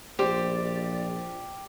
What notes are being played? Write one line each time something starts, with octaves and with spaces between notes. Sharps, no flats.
A#1 G4 C5 D5